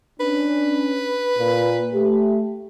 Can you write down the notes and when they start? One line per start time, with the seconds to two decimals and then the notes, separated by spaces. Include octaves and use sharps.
0.20 C#4 D4 B4
1.38 A#2
1.94 A3 G4